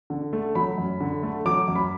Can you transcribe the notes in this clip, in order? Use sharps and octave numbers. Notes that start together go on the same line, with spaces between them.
D3
A3
F#3 B5
F#2
D3
A3
F#3 D6
F#2
B5